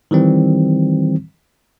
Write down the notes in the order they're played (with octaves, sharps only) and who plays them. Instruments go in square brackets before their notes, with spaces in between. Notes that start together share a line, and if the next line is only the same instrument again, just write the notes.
[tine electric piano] D#3 E3 G3 C4